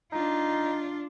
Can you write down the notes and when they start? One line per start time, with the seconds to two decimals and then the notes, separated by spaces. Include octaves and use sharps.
0.12 D4 D#4 F4